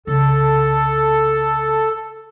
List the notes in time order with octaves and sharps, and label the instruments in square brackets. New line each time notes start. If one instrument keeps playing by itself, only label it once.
[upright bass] C2 C#3 [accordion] A4